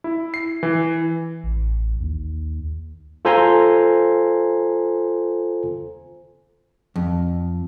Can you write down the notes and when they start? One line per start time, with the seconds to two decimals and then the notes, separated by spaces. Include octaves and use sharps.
0.04 E4
0.34 C7
0.63 E3
1.44 A1
2.00 D#2
3.25 F4 A4 C5 G#5 A#5 C6
6.96 F2